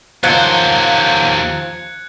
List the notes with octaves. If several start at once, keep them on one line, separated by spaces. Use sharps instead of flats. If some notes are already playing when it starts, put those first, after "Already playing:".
D#2 F3 F#3 A#3 C5 F#6 G#6 C#7